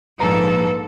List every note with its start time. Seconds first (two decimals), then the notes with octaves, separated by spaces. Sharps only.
0.20 A#1 G#2 A#3 A4 B4 A#5